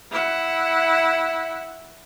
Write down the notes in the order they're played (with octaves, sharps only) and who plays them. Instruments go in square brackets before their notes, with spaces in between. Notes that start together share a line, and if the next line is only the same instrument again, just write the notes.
[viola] E4 F#5